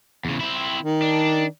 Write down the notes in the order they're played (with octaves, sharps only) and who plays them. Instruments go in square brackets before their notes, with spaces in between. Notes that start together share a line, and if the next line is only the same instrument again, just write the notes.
[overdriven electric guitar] E2 C#3
C4 E4
[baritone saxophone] D#3
[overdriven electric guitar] D4